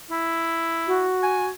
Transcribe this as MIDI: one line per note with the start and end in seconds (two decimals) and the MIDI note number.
0.11 1.10 64
0.87 1.48 66
1.23 1.48 80